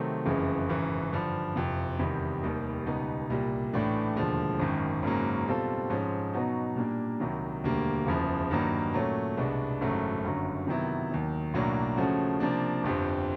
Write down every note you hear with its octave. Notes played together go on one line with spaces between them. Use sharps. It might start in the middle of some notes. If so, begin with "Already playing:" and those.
Already playing: C3 D#3 F#3 A3 C4
F#1 F2 C#3 E3 G#3
G#1 F#2 C#3 E3
G2 D3 F3
F#1 F2 C3
E2 C3 D#3 G3
F1 D#2 D#3 G3
C#2 B2 G3 B3 D#4
C2 A#2 G3
A1 A2 E3 A3 D4
E1 D#2 D3 F3 G#3
G#1 F#2 D#3
G#1 F#2 C#3 F#3 A#3
B2 G3 C4 F4 A4
G#2 F3 G#3 C#4
B2 F#3 B3 D#4 F#4
A#2 G3 A#3 D4
C2 C3 D#3 F#3
E1 D2 D3 G3 A#3
F#1 E2 C#3 F3
G2 D#3 F#3 A#3 D#4
A#2 F#3 A3 C#4
C2 B2 G#3 B3 D4
G#1 F#2 C#3 F#3 A3
G1 F#2 D3 F#3
C3 D#3 F#3 B3 E4
D#2 D#3 F#3
B1 A2 F#3 A#3 D4
C#3 F3 A3 C#4 F#4
C3 F3 A#3 D4
G1 F2 D3 G3 C4